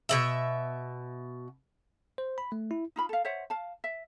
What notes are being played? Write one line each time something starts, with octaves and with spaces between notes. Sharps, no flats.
B2 G3 E5
C5
B5
A3
E4
D#4 F4 B5
A4 F5
C5 C#5 E5 F#5
F5 A5
E5